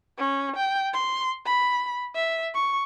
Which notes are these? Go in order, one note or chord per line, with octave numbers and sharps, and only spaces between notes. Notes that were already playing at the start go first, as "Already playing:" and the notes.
C#4
G5
C6
B5
E5
C#6